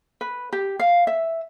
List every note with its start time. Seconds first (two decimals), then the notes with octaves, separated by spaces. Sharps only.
0.21 B4
0.53 G4
0.79 F5
1.07 E5